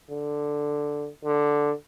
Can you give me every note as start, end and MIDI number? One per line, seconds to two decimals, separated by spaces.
0.11 1.08 50
1.25 1.73 50